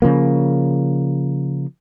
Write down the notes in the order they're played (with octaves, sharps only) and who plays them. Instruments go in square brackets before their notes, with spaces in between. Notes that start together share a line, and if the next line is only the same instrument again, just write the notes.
[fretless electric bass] C#3 F3 A#3